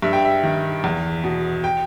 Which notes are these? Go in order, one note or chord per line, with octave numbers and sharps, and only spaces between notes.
G2 E5
G5
E5
D#3
E2
B2
G5